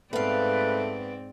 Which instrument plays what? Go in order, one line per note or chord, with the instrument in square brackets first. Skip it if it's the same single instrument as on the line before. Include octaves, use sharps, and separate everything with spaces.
[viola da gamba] G#2 C4 D5 [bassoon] A3 [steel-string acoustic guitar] B3 F5 [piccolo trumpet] B4